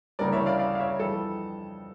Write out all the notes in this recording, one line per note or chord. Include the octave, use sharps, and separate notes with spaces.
D2 C#3 E3 G3 A#4 D5
C#5 E5
D5 F5
D5 F5
F5
C#5 E5
F2 E3 G3 A4